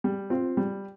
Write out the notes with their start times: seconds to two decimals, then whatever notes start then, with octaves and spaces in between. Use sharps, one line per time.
0.04 G3
0.30 C4 F4
0.57 G3